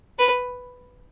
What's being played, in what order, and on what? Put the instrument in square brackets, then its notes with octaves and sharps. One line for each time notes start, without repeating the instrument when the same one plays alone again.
[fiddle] B4